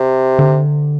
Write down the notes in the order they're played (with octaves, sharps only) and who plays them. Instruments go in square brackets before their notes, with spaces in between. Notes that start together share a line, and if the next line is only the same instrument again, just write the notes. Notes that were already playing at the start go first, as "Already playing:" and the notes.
Already playing: [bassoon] C3
[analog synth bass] D3